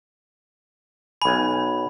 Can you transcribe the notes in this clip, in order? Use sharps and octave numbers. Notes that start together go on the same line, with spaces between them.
B1 G#5 B5